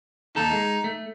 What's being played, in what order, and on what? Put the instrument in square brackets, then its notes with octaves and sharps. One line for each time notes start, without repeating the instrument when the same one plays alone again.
[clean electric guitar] D#2 A4 [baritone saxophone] D#4
[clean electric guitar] G#3
A3